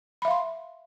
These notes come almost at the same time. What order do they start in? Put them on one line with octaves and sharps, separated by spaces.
B5 E5 F5 C6